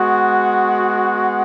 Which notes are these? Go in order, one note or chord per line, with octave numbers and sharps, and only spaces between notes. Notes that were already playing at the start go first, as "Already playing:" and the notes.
Already playing: G#3 B3 F#4